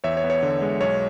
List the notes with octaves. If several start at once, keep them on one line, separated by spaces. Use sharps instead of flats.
E2 C#5 E5
C#5
B3
C#5
D3
G#3
B1 C#5